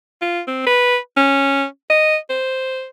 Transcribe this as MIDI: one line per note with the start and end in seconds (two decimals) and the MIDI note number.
0.22 0.41 65
0.48 0.64 60
0.66 0.97 71
1.17 1.65 61
1.90 2.17 75
2.30 2.87 72